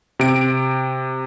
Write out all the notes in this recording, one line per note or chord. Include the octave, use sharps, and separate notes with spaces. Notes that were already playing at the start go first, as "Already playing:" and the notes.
C3 D7